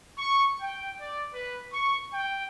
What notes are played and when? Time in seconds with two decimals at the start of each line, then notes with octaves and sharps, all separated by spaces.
0.18 C#6
0.61 G5
1.00 D5
1.34 B4
1.74 C#6
2.13 G5